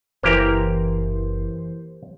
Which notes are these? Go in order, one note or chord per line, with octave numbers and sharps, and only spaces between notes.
F#1 E3 A#3 G4 A#4 C5